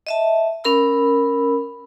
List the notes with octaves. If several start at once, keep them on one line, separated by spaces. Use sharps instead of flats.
D#5 E5 A5
C#4 A#4 B5 E6